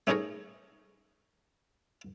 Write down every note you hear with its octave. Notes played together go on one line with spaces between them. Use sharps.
A3 C#4 D#4 G#4 A#4 C#5